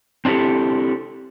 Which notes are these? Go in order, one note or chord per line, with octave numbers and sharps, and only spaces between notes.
C4 D4 E4 G4 A4